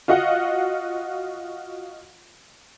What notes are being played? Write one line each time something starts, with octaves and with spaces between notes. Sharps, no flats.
F4 F#4 D#5 F5 F#5